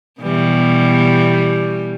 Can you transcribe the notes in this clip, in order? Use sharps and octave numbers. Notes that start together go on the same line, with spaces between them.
B2 E3 G3